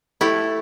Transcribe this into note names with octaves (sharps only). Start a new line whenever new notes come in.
A3 E4 G4 A4